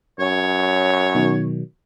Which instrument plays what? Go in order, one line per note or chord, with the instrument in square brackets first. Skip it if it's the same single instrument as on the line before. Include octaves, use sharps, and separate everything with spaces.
[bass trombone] F#2 [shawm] C#5
[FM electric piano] B2 D#3 F#3